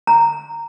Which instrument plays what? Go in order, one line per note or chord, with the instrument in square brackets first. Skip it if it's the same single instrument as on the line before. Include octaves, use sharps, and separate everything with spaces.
[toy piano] A#5